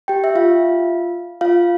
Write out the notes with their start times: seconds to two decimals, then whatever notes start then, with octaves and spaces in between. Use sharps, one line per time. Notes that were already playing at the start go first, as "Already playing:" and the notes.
0.08 G4 G5
0.24 E5
0.35 F4 F5
1.41 F4 F5